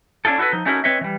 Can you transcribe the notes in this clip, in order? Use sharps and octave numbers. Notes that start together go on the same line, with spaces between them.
C#4 D4 E4 F4 A4
E4 F#4 G4 A4 B4
F3 D#4
A3 C#4 D#4 E4 F#4 A#4
C4 B4 C#5 D#5 E5
E3 G3